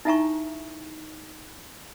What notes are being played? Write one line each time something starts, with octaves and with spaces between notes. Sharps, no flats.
D#4 E4 E5 G#5 A#5 C#6